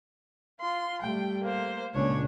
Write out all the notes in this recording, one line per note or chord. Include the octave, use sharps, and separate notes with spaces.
F4 C6
G3 A3 G5
A#3 C5
C#2 A#2 C#4 D4 C#5